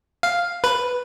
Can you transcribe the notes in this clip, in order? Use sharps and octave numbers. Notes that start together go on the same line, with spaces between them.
F5
B4